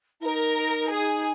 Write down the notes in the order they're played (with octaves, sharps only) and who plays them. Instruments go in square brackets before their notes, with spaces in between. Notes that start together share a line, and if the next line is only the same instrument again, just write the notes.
[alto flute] E4
[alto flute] D#4 [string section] A#4
[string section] G#4